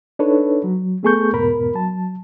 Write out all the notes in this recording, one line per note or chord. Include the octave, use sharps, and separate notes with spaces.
D4 D#4 A4 B4 C#5
F#3
A3 B3 G#4 A4 C#6 G6
E2 G#2 B2 B3 A#4 B5
F#3 A5